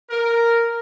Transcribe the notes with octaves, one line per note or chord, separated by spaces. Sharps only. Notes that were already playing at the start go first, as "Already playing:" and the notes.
A#4